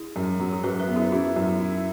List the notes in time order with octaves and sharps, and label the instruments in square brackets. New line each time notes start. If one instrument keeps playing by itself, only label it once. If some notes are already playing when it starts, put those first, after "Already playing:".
Already playing: [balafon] E4 G#4
[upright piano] F#2
F#3
[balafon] G#4
[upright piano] F#2 [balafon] F#4 B4
[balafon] B4 E5
[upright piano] B3
[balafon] E4 G#4
[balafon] C#4 F#4 [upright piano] E4
[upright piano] F#2
E4